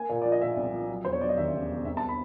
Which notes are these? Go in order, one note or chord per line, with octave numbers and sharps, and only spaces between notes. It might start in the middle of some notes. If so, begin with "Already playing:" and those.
Already playing: A#3 G#5
A#2
F3 D5
D#5
A#2 E5
C2
F3
F#3
E1 C5
C#5
F#3 D5
D#5
D#2 E5
C#3
E1
C2 E5
A5
B5